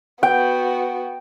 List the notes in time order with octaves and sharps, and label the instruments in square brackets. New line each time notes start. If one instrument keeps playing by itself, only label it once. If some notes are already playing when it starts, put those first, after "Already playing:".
[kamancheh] B3 F#4 [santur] G5